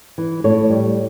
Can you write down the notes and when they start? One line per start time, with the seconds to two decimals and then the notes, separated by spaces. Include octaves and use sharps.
0.18 E3
0.44 A2 C#5
0.70 G3